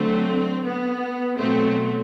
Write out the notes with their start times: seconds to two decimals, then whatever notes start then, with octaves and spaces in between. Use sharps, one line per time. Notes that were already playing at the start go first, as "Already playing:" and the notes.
Already playing: D3 F#3 A3 C4
0.65 B3
1.37 B2 F#3 A3 C4